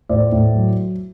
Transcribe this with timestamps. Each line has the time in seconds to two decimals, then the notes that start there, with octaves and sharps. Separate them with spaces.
0.09 A2 C5 D5
0.32 A2
0.55 F#3